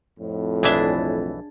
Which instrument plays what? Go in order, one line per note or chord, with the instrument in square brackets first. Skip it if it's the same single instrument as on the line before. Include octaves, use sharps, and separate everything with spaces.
[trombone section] F2 A2
[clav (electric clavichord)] B1 E3 E5 [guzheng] D4 G#4